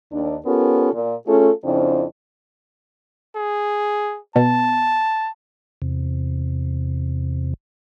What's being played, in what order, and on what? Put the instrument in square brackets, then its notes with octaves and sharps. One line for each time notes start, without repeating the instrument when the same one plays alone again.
[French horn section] D#2 D4
B3 C#4 F4 G4 A4 A#4
A#2
A3 C#4 F4 G#4 A4
F2 C#3 C4 D4 E4 C5
[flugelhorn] G#4
[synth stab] B2 [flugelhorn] A5
[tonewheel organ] E2 C3